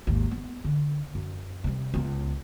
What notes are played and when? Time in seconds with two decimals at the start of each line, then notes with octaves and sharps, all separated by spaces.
0.07 G#1 D#2
0.31 B3
0.64 D3
1.15 F#2
1.64 C3 G3
1.94 C#2 B3